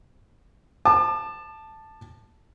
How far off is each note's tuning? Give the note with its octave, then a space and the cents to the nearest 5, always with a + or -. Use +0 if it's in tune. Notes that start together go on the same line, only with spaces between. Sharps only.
A5 +0 D6 +40